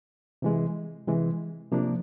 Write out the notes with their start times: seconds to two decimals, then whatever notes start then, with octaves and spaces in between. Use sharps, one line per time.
0.42 C3 E3 G#3
1.07 C3 E3 G#3
1.72 C3 F3 A#3 D4